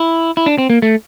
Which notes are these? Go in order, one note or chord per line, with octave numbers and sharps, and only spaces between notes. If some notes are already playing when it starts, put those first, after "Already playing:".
Already playing: E4
E4
D4
C4
A#3
A3